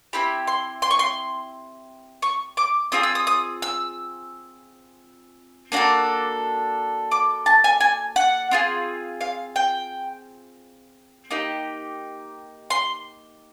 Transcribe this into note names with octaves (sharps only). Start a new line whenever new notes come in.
C4 E4 G4 B5
C6
C6
C#6
C6
C#6
D6
C4 F4 G#4 D#6
E6
D#6
D#6
E6
A#3 D4 F#4 A4
D6
A5
G#5
G#5
F#5
C4 F4 G#4
F5
G5
A#3 D#4 G4
C6